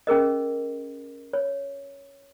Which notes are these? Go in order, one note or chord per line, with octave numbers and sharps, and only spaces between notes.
C#4 G#4 A#4 D#5
C#5